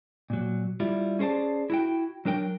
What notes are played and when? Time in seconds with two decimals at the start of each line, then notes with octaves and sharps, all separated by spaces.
0.30 A#2 F#3
0.80 G3 E4 F4
1.19 C#4 G#4 C5 D5 A5
1.70 E4 F#4 G5
2.25 F#3 D4 A#4 G5